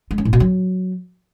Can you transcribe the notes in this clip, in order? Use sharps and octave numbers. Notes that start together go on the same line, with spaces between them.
G#3
C#4
A2
B2
F#3